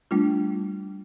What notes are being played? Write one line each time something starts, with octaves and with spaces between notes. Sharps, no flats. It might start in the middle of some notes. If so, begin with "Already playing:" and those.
G3 A3 D4 F4